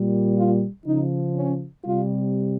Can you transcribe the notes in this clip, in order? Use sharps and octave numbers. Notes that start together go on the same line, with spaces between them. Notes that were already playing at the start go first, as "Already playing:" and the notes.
Already playing: A#2 G3
F4
C#3 F3 D#4
C#4
C3 G3 F4